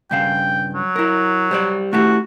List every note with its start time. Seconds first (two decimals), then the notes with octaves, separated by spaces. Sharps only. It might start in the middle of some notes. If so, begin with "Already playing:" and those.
0.11 G2 C#3 F5 G5
0.74 F#3
0.96 E4 A#4
1.51 G3 C5 D5
1.93 A3 E4 F#4 G4